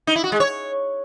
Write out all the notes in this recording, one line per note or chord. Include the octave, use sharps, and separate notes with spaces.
D#4
E4
F#4
G#3
C#5